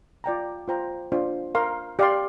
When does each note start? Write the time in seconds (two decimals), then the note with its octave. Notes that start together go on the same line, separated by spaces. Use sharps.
0.24 F4 D5 G5 A#5
0.68 F4 C5 G5 A#5
1.12 D4 F4 C5
1.55 A#4 F5 C6
1.99 G4 D5 F5 C6